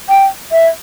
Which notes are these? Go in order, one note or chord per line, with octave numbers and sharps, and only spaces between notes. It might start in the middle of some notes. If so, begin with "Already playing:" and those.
G5
E5